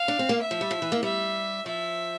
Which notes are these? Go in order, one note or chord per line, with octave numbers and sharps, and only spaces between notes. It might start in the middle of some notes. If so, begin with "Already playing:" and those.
Already playing: F5
D4
C4
A#3
E5
F3
G3
F3
E3
A#3
G3 E5
F3 E5